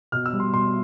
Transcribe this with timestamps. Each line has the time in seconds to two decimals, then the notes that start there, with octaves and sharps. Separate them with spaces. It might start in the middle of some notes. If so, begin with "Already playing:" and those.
0.12 B2 F6
0.26 E6
0.33 G3
0.40 C6
0.53 B2 C6